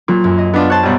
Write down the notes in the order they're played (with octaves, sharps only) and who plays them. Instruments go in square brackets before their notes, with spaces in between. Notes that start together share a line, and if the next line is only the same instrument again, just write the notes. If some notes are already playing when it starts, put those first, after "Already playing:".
[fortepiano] A#2 [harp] F#3
[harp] F#2
D#5
[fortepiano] B3 D4 F4
[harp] C5 C#5 [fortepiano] A5 F#6
[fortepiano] B1 G3